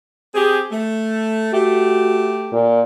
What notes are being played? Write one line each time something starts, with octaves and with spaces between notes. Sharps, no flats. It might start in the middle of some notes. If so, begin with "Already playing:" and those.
C4 G4 G#4
A3
A3 F#4 G4
A#2